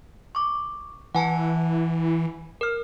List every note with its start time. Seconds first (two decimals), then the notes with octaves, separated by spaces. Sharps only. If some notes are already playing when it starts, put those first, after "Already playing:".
0.35 C#6 D6
1.15 E3 F#5 G#5 A5
2.61 A#4 F6